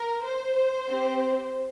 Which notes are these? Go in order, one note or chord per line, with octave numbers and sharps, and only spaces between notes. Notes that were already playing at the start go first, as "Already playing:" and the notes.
Already playing: A#4
C5
C4 G4